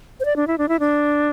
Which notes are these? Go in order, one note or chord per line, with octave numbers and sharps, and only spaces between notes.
C5
D5
D4
E4
D4
E4
D4